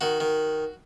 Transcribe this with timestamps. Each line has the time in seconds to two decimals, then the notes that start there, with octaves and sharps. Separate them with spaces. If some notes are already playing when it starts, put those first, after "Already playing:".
0.01 D#3 F#4
0.20 D#3